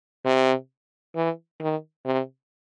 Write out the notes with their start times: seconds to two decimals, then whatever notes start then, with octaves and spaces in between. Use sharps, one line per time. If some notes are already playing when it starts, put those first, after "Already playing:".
0.25 C3
1.16 E3
1.61 D#3
2.06 C3